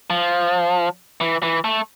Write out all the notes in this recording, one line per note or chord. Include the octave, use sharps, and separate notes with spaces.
F3
E3
E3
A3